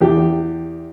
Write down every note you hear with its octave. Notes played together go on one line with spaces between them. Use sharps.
E2 G4